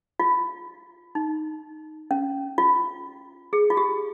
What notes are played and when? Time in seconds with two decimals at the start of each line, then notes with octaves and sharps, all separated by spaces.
0.20 F4
1.15 D#4
2.11 C#4
2.58 F4
3.53 G#4
3.70 F4
3.77 G4